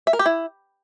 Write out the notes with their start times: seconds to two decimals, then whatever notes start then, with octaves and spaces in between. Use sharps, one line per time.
0.07 E5
0.13 A#4
0.19 G4
0.26 E4